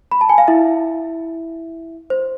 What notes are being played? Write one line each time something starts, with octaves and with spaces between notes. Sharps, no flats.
B5
A5
G#5
F5
E4 E5
C5